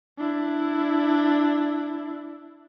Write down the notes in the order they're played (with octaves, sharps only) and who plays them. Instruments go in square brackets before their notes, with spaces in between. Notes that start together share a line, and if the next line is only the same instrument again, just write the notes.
[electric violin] D4 E4